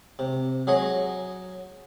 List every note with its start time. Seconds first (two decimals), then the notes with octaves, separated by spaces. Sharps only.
0.19 C3
0.67 F#3 G#4 C#5 D#5